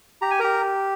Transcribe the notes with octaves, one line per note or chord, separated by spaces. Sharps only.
G4 A#5
G#5
G4 A#4 A#5